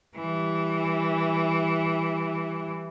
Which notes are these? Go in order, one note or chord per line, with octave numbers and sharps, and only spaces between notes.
E3 G3